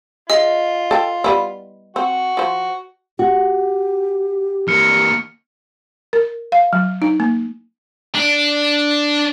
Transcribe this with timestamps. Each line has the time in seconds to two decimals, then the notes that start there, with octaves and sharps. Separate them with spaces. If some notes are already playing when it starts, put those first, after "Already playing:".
0.30 F4 G#4 D#5
0.91 A4 G5
1.24 G3 B3 E4
1.96 C4 F#4
2.37 F3 C5
3.19 F#4 G4
4.68 E3 A#3 F6 C#7
6.13 A#4
6.52 F5
6.73 F#3
7.02 D#4
7.20 A#3
8.15 D4 D5